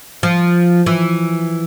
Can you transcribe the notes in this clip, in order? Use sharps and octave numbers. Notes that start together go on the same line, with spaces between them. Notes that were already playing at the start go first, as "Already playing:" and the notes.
F3
E3